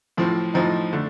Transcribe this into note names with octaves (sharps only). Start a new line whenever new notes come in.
A2 F3 C4
A2 F3 C4 D#4
D3 A3